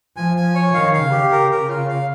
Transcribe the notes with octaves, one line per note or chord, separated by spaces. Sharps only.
F3 G#5
G#5
C#5
D#3 F5
F5
C#3
G4
A#4
A#4
F4
F5